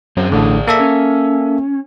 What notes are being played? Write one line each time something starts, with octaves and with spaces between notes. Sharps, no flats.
F#2 C4 G#4 C5
A1 A2 D3 D4 G#4
A#3 A4 E5
C#4